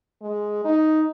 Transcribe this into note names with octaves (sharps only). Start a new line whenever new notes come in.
G#3
D#4